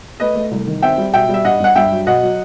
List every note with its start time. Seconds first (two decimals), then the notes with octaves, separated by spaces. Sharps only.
0.20 A3 B4 D#5
0.36 A3
0.51 C2
0.67 D#3
0.82 C4 E5 G5
0.98 G3
1.14 B2 E5 G5
1.29 G3 E5
1.45 G2 D#5 F#5
1.60 G2 F#5
1.75 G2 E5 G5
1.92 F#3
2.06 B2 D#5 F#5
2.23 F#3